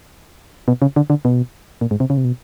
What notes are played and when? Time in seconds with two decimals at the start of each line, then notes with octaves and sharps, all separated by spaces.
0.68 B2
0.82 C#3
0.96 D3
1.10 D3
1.25 B2
1.81 A#2
1.91 G#2
2.00 C3
2.10 C#3
2.17 C3
2.24 B2